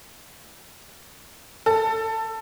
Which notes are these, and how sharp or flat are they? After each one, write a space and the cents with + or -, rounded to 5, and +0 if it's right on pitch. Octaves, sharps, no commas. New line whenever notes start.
A4 +15